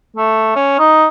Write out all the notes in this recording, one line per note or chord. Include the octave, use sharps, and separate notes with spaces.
A3
C#4
D#4